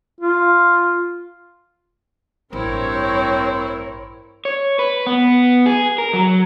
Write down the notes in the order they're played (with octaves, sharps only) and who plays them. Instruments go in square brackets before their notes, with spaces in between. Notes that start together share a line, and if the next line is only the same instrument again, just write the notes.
[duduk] F4
[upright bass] A1 [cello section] G2 C#5 [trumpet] C4 [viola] E4 A#4
[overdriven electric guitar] C#5
B4
B3
G#4
A#4
F#3